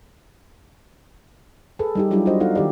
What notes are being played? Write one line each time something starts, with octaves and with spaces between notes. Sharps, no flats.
G#4 A4 B4
G3 D#4 G4
F#3 G3 D4 E4 F4 G4
D4 F#4 G#4 C5 D#5
B3 D#4 F4 A4 F5 F#5
D#3 G4 A#4 D5